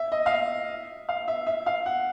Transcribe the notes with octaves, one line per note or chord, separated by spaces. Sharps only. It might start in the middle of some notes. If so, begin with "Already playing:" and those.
Already playing: E5
D#5
F5
E5
F5
E5
E5
F5
F#5